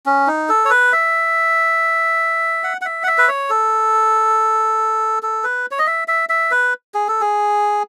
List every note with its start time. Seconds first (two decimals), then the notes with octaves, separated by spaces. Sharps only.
0.06 C#4
0.27 D#4
0.49 A4
0.65 C#5
0.70 B4
0.93 E5
2.64 F#5
2.81 F#5
2.85 E5
3.03 F#5
3.07 E5
3.18 B4
3.28 C#5
3.50 A4
5.23 A4
5.44 B4
5.71 C#5
5.79 D#5
5.87 E5
6.08 E5
6.29 E5
6.51 B4
6.94 G#4
7.08 A4
7.21 G#4